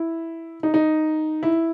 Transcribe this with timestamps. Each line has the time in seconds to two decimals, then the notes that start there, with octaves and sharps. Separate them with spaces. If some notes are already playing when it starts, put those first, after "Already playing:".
Already playing: E4
0.63 D#4
0.74 D#4
1.43 E4